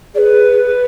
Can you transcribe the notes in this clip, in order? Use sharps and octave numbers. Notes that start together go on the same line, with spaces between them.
G#4 B4 D5